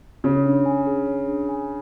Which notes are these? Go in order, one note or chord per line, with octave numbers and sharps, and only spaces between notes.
C#3 C#5
D4
G#5
G#4
C#5
D4
G#5